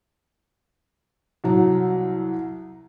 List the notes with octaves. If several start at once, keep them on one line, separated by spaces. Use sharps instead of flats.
C2 F#3